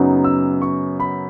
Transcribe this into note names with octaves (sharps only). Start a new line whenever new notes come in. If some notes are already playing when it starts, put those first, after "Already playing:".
Already playing: F#2 C#3 F#3 B3 D#4
E6
C#6
B5